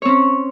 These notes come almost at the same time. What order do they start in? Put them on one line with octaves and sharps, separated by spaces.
C#5 C4 C#4